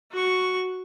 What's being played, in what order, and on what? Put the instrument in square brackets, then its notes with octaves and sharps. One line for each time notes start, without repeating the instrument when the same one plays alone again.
[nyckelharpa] F#4 C#6